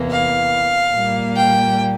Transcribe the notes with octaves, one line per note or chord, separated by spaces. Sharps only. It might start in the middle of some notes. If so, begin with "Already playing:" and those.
Already playing: E2 C3 E3 A#3
F5
A#2 G3 A#3
G5